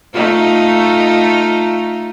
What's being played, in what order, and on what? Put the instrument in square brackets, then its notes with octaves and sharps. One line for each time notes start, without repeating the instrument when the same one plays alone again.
[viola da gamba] A3 D#4 F4